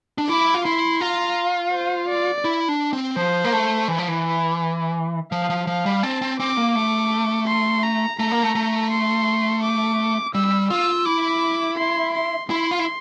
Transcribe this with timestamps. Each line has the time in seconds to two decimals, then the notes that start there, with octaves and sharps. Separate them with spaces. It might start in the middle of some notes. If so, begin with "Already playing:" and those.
0.18 D4
0.29 E4 D6
0.54 F4
0.65 E4 C6
1.01 F4 A#5
1.73 C5
2.08 D5
2.45 E4
2.68 D4
2.93 C4
3.17 F3 C5
3.45 A#3
3.53 A3
3.88 E3
3.98 F3
4.08 E3
5.32 F3 F5
5.50 F3
5.67 F3 F5
5.86 G3
6.03 C4 A5
6.22 C4
6.40 C4 D6
6.57 A#3
6.75 A3 D6
7.47 C6
7.83 A#5
8.19 A3 A#5
8.32 A#3
8.43 A3
8.55 A3
8.91 C6
9.63 D6
10.35 G3 E6
10.70 F4 E6
11.06 E4 D6
11.78 C6
12.14 C6
12.50 E4 C6
12.71 F4
12.79 E4